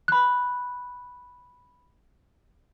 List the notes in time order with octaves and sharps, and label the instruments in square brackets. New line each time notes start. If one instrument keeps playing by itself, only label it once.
[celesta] B5 F#6